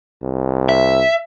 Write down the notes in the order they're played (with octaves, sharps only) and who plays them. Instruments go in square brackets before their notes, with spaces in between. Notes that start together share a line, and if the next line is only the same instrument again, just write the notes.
[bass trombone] C2
[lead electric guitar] E5